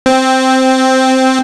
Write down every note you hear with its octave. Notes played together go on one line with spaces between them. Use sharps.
C4